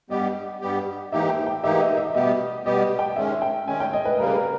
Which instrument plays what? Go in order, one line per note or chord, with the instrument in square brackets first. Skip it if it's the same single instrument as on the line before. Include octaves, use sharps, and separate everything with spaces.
[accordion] G2 G3 B3 G4 [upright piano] D#5
[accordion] G2 G3 B3 G4
[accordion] G#2 E3 A#3 D#4 G4 [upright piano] E5
[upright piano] G5
G5
[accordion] G#2 E3 A#3 D#4 G4 [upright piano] E5
[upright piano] D#5
E5
[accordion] B2 G3 B3 G4 [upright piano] D#5
[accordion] B2 G3 B3 G4 [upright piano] D#5
[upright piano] G5
[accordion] D#3 G#3 C#4 [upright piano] E5
[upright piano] G5
[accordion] D#3 G#3 C#4 [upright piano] G#5
[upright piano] G5
D#5
B4
[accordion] C#3 G3 A#3 [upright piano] A#4
[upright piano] B4
A#4